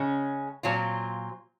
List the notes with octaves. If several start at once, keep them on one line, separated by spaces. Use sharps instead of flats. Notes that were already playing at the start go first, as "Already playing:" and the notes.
Already playing: C#3 G#3 C#4
A#2 F#3 C4 F4